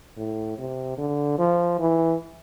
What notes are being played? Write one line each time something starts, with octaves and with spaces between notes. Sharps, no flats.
A2
C3
D3
F3
E3